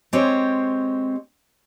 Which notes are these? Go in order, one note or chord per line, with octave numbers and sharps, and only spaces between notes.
G#3 C4 G4 C5 C#5